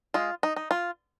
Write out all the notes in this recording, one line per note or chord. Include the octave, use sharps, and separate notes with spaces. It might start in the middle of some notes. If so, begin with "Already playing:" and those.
G#3 F4
D#4
D#4
F4